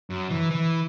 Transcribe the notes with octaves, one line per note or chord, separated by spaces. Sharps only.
F#2
E3
E3